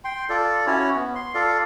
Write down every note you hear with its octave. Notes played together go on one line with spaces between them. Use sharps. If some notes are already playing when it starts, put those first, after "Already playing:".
G5 C6
F4 A4 D5
C#4 E4 F#4 C#5
B3
C6
F4 A4 D5 F5